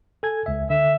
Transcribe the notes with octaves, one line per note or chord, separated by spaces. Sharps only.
A4 G#5 G#6
C#2 E5
D3 E5